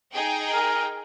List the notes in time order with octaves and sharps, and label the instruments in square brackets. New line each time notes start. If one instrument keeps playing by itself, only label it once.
[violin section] D#4 G#4 G5
[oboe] A#4